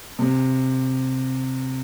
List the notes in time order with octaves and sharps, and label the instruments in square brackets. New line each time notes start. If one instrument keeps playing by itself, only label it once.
[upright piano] C3